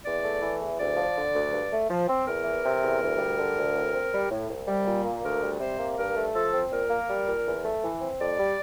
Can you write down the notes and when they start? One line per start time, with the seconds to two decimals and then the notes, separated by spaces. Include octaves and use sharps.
0.04 E2 D5
0.23 A3
0.41 E3
0.59 E2
0.78 D2 D5
0.97 F3
1.15 D3
1.34 D2
1.52 G2
1.71 A3
1.90 F3
2.08 C4
2.26 E2 A#4
2.44 E3
2.64 C3
2.82 E2
3.01 D2
3.18 G3
3.37 D3
3.56 D2
3.75 A2
3.93 C4
4.12 G3
4.30 A2
4.48 C2
4.68 G3
4.86 A#2
5.04 A#3
5.23 D2 A#4
5.41 G3
5.60 C3 C5
5.78 A#3
5.97 G2 A#4
6.16 A3
6.34 F3 A4
6.52 C4
6.71 A#2 A#4
6.90 A#3
7.08 G3
7.27 A#2
7.46 E2
7.64 A3
7.83 E3
8.01 C4
8.19 F2 D5
8.38 G3